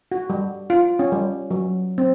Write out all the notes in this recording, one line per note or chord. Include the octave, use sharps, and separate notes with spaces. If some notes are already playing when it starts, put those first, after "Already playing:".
F#4
G3
F4
C#4
G3
F#3
C4